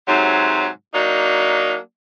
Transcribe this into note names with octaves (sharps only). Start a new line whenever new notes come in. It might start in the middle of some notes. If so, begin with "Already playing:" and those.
G#2 C3 F#3
F#3 A#3 D4 D#4